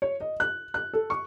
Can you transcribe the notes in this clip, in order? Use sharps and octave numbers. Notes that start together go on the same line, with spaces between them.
C#5
D#5
F#6
F#6
A4
C#6